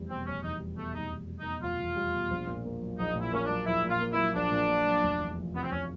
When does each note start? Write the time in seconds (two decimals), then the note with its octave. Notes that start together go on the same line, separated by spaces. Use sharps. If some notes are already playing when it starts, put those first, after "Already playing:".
Already playing: F1 E2 G3
0.09 B2 C4
0.26 F1 C#4
0.43 E2 D#4
0.60 G3
0.77 B2 A3
0.95 F1 D#4
1.11 E2
1.29 G3
1.40 D#4
1.46 B2
1.62 F1 F4
1.80 E2
1.96 G3
2.14 B2
2.31 A#1
2.47 A#2
2.65 A#3
2.82 F#3
2.98 A#1 D#4
3.15 A#2
3.21 E4
3.33 A#3 C#4
3.45 F#3 D4
3.66 A#1 E4
3.84 A#2
3.89 F4
4.01 A#3
4.12 E4
4.18 F#3
4.35 A#1 D4
4.51 A#2
4.69 A#3
4.85 F#3
5.03 F1
5.20 E2
5.37 F3
5.54 C3 B3
5.63 C4
5.71 F1 C#4